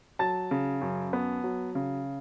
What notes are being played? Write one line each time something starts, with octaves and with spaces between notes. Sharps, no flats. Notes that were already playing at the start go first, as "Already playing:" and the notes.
F#3 A5 A6
C#3
F#2
B3
F#3
C#3